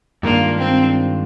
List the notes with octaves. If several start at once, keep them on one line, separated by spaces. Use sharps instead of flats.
G2 D#3 G#3 A#3 D4 F4
C4